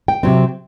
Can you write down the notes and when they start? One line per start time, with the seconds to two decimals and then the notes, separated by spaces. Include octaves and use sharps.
0.08 G5
0.23 C3 F#3 C4